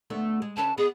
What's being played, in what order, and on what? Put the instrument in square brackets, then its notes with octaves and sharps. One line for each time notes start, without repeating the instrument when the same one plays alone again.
[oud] D2 A3 B3
G#3
[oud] D3 C#4 B4 [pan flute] A5
[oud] B3 D#5 [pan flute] G#4